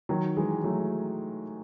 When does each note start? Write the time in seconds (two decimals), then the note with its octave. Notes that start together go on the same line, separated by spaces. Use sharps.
0.09 D#3 F#3
0.37 E3 G#3
0.64 F#3 A3